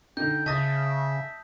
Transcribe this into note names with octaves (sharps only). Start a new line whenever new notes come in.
D3 D#4 G5 G6
C#3 D#5 E5 A5 D#6 A6 A#6